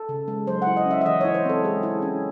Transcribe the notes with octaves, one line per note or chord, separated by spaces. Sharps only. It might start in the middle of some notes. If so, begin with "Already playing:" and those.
Already playing: A4
C#3
G#3
F#3 C5
F#5
E4
D#5
C#4 E5
E5
E3 D#5
E4 C#5
C5
C4 A4
G#3 G#4
E4
C#4